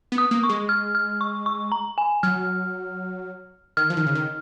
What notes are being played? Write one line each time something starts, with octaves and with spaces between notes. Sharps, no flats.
B3
D#6
A#3
C#6
G#3
F6
F6
C#6
C#6
A#5
G#5
F#3 F6
D#3 F6
F3
D#3
C#3
D#3